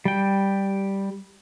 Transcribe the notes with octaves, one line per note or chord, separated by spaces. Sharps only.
G3 G5